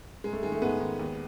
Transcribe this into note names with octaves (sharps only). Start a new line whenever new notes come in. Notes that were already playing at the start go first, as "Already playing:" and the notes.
G#2 G#3
A3
D#3 G#3
A3
G#2 G#3 B3
D#3
D#2